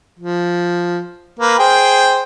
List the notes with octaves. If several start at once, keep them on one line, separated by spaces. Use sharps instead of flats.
F3
A#3 B4
G#4 C5 G5